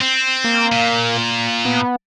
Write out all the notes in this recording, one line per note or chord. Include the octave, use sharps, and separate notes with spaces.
C4
A#3
A#2
B3